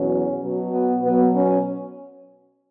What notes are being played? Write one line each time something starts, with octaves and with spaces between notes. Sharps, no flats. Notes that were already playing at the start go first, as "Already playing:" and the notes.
Already playing: E2 B2 F#3 C#4
B2 F#3
B3
B2 F#3 B3
C#4